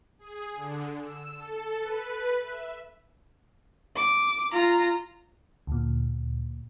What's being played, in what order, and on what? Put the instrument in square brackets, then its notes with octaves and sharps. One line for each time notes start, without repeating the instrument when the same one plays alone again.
[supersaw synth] G#4
D3
E6
A4
B4
E5
[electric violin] D6
F4 A#5
[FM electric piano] D2 A#2